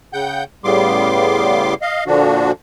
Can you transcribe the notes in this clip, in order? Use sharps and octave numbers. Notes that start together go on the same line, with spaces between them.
C#3 F#5 G5 G6
A2 C#3 G3 B3 C6 D6
D#5 F5
A#2 D3 F3 D4 F#4